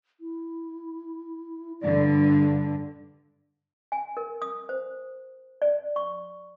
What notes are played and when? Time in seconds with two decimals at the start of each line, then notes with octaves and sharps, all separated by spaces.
0.20 E4
1.81 G2 D3 D5
2.16 D4
3.92 G#5
4.17 A#4
4.42 D#6
4.69 C5
5.62 D5
5.96 C#6